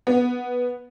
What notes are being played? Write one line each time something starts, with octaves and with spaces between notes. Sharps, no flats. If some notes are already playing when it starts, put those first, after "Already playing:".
B3